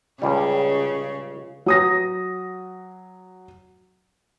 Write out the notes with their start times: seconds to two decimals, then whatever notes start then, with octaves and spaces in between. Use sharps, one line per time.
0.22 C#2 C#3 G3
1.66 F#3 D#6 A#6